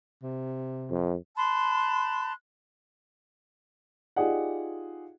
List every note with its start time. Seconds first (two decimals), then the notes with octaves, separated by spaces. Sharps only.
0.23 C3
0.91 F2
1.37 A5 B5 C6 F#6
4.16 D#4 F4 G4 G#4 D5 F#5